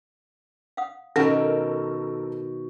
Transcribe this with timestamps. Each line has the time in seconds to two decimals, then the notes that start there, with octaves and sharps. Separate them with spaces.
0.77 F5 F#5 D#6
1.16 B2 D#3 C#4 A4 A#4 F5 F#5 A5